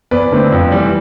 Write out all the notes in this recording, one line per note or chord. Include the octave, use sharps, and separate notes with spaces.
E2 B4 D5
D3 A3 C4
F2
E3 G3